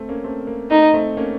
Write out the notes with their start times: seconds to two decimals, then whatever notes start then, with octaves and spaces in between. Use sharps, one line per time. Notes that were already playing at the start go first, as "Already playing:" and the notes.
Already playing: A3 C4
0.09 A#3 C#4
0.24 A3 C4
0.47 A#3
0.71 A3 D#4
0.94 A3 C4
1.17 A#3 C#4